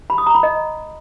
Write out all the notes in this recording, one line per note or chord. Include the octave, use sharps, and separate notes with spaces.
B5
D#6
A#5
B5
D#5